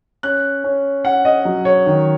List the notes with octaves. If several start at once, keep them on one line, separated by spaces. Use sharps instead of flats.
C#4 F#6
C#4
C#4 F#5
D#5
F#3
C#5
D#3